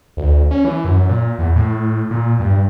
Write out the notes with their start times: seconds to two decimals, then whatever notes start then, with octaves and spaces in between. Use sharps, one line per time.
0.17 D2
0.51 C#4
0.65 E3
0.85 F#2
1.09 A#2
1.39 E2
1.56 A2
2.11 A#2
2.40 G2